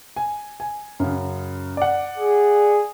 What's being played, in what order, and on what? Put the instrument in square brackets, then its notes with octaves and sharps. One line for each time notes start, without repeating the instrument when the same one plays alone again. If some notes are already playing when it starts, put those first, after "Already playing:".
[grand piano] G#5
G#5
F#2 C#3
D5 F#5
[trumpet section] G#4